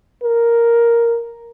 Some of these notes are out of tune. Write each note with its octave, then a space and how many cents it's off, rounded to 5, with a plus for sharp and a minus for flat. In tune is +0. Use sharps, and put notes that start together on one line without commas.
A#4 +0